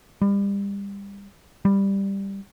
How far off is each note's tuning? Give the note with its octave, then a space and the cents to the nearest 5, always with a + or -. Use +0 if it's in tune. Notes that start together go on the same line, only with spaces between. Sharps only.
G3 +30
G3 +5